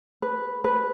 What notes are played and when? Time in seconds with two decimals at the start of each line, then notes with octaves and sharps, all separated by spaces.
0.22 B4
0.64 B4